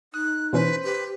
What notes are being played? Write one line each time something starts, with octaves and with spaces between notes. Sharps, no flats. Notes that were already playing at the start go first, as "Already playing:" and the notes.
D#4 D#6 F#6
B2 E3 C#4 B4 C5
G4 B4